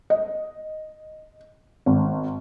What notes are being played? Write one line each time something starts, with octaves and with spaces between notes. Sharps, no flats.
D#5
G#1